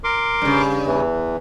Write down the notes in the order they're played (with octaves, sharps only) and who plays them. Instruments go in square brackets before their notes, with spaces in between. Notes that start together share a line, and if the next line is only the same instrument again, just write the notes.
[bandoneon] A#4 C6 D6
[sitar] G2 C#3
[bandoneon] E2 E3